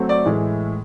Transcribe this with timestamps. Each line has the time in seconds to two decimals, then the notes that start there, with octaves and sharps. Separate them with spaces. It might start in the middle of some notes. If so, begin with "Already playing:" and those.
Already playing: F#3 A3 C4
0.09 D5
0.25 A2 E3 G#3